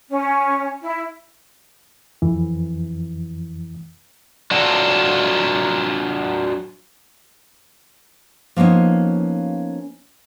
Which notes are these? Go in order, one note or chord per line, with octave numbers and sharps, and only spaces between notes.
C#4
E4
F2 E3
F#3 D4 F4 F#4 A4
F3 A#3 B3 C#4 D#4